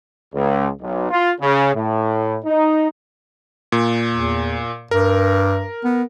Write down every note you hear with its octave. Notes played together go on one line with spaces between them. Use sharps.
C#2
B1
F4
C#3
A2
D#4
A#2
E2
G2 A#4
B3